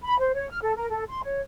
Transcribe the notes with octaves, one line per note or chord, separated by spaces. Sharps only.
B5
C5
C#5
F6
A4
A#4
A4
C6
C#5